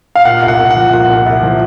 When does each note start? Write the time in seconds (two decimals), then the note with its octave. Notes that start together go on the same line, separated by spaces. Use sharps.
0.15 F5
0.25 A#2 F#5
0.43 C2
0.48 F#5
0.59 C2
0.71 F#5
0.76 F3
0.93 A#2 F#5
1.10 C2
1.26 C2
1.43 F3